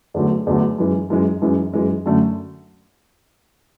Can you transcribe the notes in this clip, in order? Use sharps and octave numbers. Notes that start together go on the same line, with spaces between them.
E2 D3 F#3 A3
E2 D3 F#3 A3
F#2 E3 G#3
F#2 E3 G#3
F#2 E3 G#3
F#2 E3 G#3
F#2 D3 A3